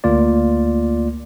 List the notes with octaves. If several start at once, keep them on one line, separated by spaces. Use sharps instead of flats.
D2 A#3 F4 D5